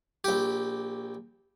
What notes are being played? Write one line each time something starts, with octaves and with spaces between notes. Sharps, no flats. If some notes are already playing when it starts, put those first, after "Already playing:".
A#1 G4